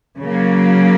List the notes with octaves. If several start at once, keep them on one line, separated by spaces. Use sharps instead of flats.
C#3 F#3 A#3